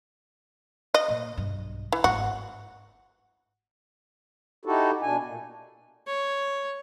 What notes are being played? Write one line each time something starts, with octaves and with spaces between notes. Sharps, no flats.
D#5
A#2
B1 G2
E3
G1 G#2 F#4
D#4 E4 F#4 G4 A4
B2 D4 G#5
A#2
C#5